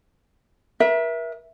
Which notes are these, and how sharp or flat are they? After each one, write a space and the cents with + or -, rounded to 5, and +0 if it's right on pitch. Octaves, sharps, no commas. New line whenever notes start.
A#4 +45 E5 +0